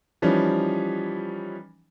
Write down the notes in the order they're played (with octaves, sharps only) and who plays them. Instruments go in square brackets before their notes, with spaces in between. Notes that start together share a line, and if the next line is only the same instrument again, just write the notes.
[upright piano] E3 F3 G3 C#4 D#4